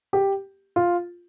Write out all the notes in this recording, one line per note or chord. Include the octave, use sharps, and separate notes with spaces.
G4
F4